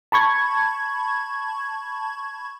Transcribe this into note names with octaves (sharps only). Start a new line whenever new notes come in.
A5 B5 C#6 G#6